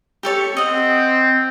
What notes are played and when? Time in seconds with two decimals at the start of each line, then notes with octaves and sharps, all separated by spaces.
0.23 G4 A4 C#5
0.57 C4 D#5 F#5